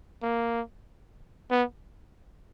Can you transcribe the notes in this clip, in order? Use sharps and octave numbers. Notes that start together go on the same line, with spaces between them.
A#3
B3